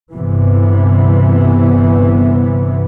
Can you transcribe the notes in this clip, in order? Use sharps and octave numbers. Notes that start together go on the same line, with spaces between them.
G1 C3 E3 B3